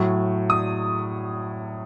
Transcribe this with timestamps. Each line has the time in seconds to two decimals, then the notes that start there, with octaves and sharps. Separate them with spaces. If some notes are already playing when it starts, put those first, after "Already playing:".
Already playing: A2 F#3
0.50 D#6